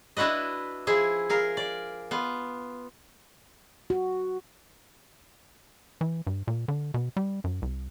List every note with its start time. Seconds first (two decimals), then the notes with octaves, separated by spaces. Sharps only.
0.17 D4 E4 F#4 B4 D#5
0.87 F3 E4 G#4
1.29 G#4 A#4 F5
1.57 D5
2.11 B3 F4
3.90 F#4
6.01 E3
6.27 G2
6.48 A#2
6.68 D3
6.94 B2
7.17 G3
7.44 F#2
7.62 C2